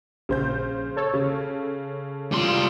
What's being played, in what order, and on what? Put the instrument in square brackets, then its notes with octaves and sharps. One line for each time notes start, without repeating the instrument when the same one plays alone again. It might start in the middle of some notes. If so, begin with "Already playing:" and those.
[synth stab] A#1 [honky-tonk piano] C#3 C5 G6
[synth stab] A4 C#5
[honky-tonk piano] C#3
[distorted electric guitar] G3 C6 [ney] F4